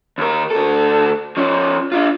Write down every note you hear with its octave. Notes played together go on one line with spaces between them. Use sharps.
D#2 A#4
D2 A4
F3 C#4
D4 F4